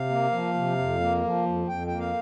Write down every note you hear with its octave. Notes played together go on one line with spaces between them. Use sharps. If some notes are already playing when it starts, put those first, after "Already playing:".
Already playing: C3 F5
A#3
F3
C3
F2
A#3
F3
F2
F2 G5
A#3 G5
F5